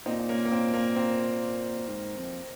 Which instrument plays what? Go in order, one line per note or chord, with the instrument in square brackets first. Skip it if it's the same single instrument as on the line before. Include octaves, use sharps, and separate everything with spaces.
[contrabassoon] A#2 [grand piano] C4 D#4
[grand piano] D#4
A#3 C#4
A#3
C4
A#3
C4
[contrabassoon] A#2
G#2
F2